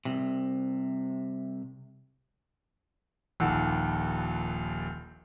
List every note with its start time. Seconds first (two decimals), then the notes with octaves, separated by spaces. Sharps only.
0.05 C2 C3
3.40 D#1 A#1 D#2 F#5 E6